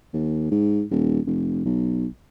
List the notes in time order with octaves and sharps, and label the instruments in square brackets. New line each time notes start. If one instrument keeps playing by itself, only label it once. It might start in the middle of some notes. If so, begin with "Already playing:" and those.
[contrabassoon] D#2
G#2
D#1
F1
B1